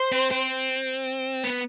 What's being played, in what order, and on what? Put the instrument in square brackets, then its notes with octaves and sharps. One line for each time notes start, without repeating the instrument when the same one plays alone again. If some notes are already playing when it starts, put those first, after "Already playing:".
Already playing: [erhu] C5
[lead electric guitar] C4
C4
B3